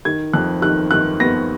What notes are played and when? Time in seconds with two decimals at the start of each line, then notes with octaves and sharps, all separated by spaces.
0.05 D#3 G#6
0.33 F2 F#6
0.62 D#3 F#6
0.91 D#3 F#6
1.20 B3 A#6